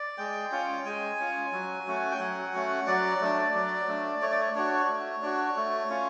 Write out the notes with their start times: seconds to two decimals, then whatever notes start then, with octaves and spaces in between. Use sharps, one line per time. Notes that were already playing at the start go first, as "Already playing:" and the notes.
Already playing: D5
0.18 G#3 G5
0.52 C#4 F4
0.85 G#3 G#5
1.19 C#4 F4
1.52 F#3
1.87 A3 C#4 F#4
2.11 G5
2.20 F#3 F#5
2.54 A3 C#4 F#4
2.87 F#3 D5
3.21 A3 D4
3.54 F#3 D5
3.88 A3 D4
4.22 A3 C#5
4.31 D5
4.42 C#5
4.55 D4 F#4 C#5
4.88 A3
5.22 D4 F#4
5.56 A3
5.90 C#4 F4